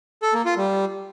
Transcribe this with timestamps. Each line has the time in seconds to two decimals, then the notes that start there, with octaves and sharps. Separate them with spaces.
0.23 A4
0.34 A#3
0.46 F4
0.57 G3